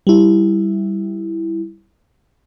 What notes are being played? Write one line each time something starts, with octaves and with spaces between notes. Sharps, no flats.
G3 E4